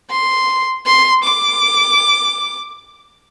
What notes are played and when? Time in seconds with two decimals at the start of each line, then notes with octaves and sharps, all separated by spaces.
0.10 C6
0.86 C6
1.24 D6